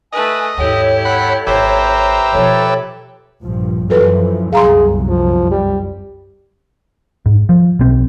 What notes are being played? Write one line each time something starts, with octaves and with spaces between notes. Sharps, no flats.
A3 B4 D#5 G#5
D#2 G#2 E4 G4 A4 C#5
F#5 B5
G#1 G4 B4 C5 E5 A#5
B2 F3 A4 C#5
A#1 G2 F3
F#2 E3 F3 F#4 A4 B4
G1 C2 F#2 G#4 F5 A#5 C6
F3
G3
G#2
F3
B1 C4